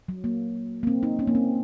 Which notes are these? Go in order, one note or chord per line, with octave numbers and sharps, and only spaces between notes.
F#3
A#3
A#3
C4
D#4
C#4
A#3
C4